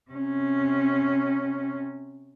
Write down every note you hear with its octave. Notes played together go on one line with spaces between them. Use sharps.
C3 C#4